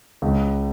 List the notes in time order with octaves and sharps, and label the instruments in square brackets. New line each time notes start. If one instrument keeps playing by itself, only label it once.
[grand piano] C#2